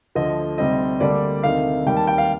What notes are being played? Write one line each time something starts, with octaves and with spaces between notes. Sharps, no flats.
D2 D3 F3 A3 D#5
D2 C3 G3 C4 D#4 D#5
D2 D3 G3 A#3 D4 D5
D2 C3 D#3 A3 D#4 F5
D#2 D#3 G3 G5
A5
G5
F5